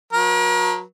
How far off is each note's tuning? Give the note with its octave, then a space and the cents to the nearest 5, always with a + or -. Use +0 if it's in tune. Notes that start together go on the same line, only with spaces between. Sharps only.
F#3 -30 A#4 +40